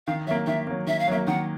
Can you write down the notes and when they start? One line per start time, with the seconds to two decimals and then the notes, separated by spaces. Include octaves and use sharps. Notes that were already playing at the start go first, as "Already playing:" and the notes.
0.07 D#3 F5
0.27 F#3 E5
0.31 A#3
0.47 D#3 E5
0.67 F#3 A#3
0.87 D#3 E5
0.99 F5
1.08 F#3 A#3 E5
1.27 D#3 F#5